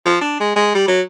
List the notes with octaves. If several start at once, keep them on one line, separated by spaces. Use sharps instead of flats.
F3
D4
G#3
G#3
G3
F#3